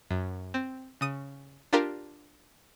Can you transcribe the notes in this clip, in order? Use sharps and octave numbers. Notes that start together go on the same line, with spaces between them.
F#2
C4
C#3 D#6 D#7
D4 F4 G4 A#4